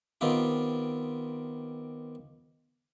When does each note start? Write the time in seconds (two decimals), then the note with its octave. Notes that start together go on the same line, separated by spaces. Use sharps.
0.21 D#3 B3 C4 F4 G4